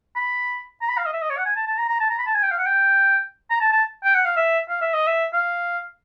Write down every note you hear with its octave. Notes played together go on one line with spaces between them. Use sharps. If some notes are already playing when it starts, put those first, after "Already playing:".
B5
A#5
B5
F5
D#5
E5
D#5
C#5
F#5
G#5
A5
A5
A#5
A#5
A5
A#5
B5
A5
G#5
G5
F5
F#5
G5
A#5
A5
A5
G5
F#5
F5
E5
F5
E5
D#5
E5
F5